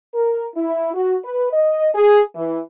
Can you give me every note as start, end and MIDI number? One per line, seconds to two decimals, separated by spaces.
0.14 0.46 70
0.56 0.90 64
0.94 1.17 66
1.24 1.47 71
1.53 1.89 75
1.95 2.22 68
2.35 2.59 52